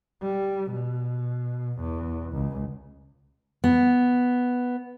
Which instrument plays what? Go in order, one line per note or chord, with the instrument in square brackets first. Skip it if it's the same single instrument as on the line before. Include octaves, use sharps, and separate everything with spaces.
[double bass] G3
B2
E2
C#2
[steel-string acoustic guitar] B3